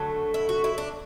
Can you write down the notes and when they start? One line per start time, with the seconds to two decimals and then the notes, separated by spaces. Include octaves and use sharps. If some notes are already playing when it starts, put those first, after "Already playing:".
Already playing: D3 F#3 A3
0.34 E4
0.49 F#4
0.64 E4
0.78 D4